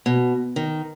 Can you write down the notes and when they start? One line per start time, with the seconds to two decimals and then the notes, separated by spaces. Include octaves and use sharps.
0.06 B2
0.56 D#3